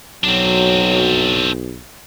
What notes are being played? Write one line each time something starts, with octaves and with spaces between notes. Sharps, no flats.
B1 F#3 C4 D4